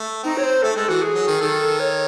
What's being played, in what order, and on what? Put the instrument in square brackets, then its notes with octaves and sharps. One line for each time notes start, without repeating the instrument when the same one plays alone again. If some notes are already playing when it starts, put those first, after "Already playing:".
Already playing: [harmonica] A3
[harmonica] C4 [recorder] D#4
[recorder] C#5
C5
[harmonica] A3 [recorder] A4
[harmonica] G#3 [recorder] A4
[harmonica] E3 [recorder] F#4
[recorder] G#4
[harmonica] F#3
D#3
[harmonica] D#3 [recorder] A4
[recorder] C#5